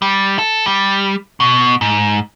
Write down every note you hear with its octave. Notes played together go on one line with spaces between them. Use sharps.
G3
A4
G3
B2
G#2